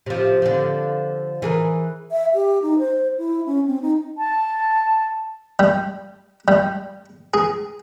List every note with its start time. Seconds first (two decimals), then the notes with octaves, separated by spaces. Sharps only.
0.06 C3 F3
0.42 D3 F3
1.42 E3 G#4 A#4
2.12 E5
2.34 G4
2.62 D#4
2.79 C5
3.18 E4
3.46 C#4
3.66 C4
3.82 D#4
4.18 A5
5.59 G3
6.48 G3
7.34 G#4